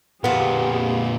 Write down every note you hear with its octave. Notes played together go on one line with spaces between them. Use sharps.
F2 A#2 B3 F4 G4 G#4